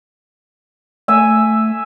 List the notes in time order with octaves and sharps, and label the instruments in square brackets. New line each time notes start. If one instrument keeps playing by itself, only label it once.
[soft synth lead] A3 [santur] E5 G#5